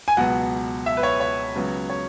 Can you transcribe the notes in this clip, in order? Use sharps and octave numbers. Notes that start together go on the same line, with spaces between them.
G#5
C#2 B2 F#3 B3 F#5
E5
B4
C#5
C#5
C#2 C#3 F#3 B3
C#5